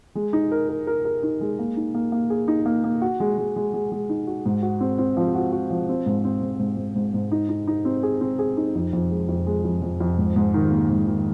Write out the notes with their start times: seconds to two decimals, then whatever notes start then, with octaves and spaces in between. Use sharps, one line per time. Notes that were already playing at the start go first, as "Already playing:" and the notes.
0.15 G#3
0.33 D#4
0.52 A#4
0.69 A#4
0.87 A#4
1.05 A#4
1.23 D#4
1.41 G#3
1.59 A#3
1.77 D#4
1.95 A#3
2.12 A#3
2.30 G#4
2.48 D#4
2.66 A#3
2.84 A#3
3.02 F#4
3.20 G#3
3.38 G#3
3.56 G#3
3.74 G#3
3.92 G#3
4.09 D#4
4.27 F#4
4.46 G#2
4.62 F#4
4.81 C4
4.98 C4
5.17 F3
5.35 F#4
5.52 F#4
5.70 F3
5.89 C4
6.06 G#2
6.25 C4
6.42 G#2
6.59 G#2
6.78 G#2
6.95 G#2
7.14 G#2
7.32 D#4
7.49 D#4
7.67 D#4
7.85 C4
8.03 G#4
8.21 C4
8.39 G#4
8.57 D#4
8.75 F2
8.93 F2
9.11 G#3
9.29 F2
9.46 G#3
9.65 F2
9.82 F2
10.00 F2
10.18 G#2
10.36 G#2
10.54 D#3
10.71 A#3
10.89 G#2
11.07 D#3